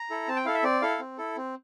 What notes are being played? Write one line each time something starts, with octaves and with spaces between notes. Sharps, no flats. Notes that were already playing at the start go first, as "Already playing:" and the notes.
Already playing: A#5
E4 A4
C4 A5
G5
E4 A4 F5
E5
C4 D5
E4 A4 F5
C4
E4 A4
C4